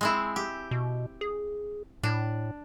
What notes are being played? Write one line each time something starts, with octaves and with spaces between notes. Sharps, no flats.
G#3 C4 E4
G4
B2
G#4
A2 D4